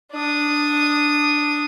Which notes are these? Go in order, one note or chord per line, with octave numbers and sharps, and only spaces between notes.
D4 D#6